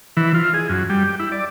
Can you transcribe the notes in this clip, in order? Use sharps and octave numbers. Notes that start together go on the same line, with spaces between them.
E3
F4
G#4
F#2
G3
G4
E4
D5